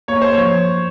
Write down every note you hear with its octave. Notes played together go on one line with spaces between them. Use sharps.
A#3 C#5
C5
F3 C#5